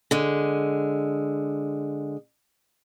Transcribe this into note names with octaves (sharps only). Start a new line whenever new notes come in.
D3 G#3